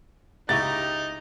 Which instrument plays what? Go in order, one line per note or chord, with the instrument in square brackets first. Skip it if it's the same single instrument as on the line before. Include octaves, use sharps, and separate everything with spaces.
[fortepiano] C#2 E4 C#6 [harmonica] D#4 [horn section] G4 A#5 [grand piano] A6